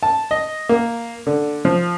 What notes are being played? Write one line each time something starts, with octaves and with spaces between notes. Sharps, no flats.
A5
D#5
A#3
D3
F3